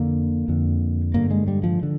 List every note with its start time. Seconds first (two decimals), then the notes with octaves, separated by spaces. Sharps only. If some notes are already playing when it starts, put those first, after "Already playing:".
Already playing: F2 D3 A#3
0.48 F2 D3
1.14 G2 D3 A#3
1.31 G#3
1.48 G3
1.64 F3
1.83 D3